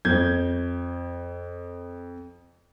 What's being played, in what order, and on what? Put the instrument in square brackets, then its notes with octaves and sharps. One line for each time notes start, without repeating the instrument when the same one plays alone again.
[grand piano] F2 G6 G#6